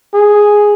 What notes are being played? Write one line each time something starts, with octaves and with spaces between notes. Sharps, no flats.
G#4